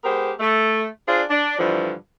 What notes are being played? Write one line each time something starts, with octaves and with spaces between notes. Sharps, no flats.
G#3 B3 G4 A#4 C5
A3
D4 F4 G#4 C5 D5
D4
G2 D3 E3 F3